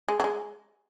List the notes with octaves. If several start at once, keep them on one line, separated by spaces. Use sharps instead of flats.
G#3
F#3
G#3